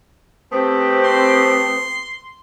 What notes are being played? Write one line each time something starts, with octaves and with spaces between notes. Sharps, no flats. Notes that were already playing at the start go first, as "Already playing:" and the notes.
A3 B3 C4 G4
C6